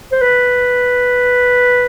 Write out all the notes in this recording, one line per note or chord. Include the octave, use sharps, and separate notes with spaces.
C5
B4